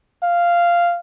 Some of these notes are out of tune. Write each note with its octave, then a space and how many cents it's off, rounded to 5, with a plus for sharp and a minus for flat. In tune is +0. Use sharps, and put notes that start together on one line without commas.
F5 -10